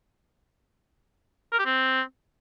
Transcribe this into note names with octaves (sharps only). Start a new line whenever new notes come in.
A#4
G4
C4